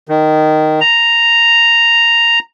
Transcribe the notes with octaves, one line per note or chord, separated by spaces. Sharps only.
D#3
A#5